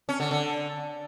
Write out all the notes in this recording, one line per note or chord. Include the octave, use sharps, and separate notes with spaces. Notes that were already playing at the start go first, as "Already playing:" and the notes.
C#4
D3
D3